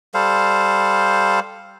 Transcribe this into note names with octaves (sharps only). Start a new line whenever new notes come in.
G3 A4 C5 F5